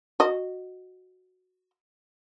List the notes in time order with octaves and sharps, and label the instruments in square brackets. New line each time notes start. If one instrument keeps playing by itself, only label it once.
[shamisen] F#4 D#5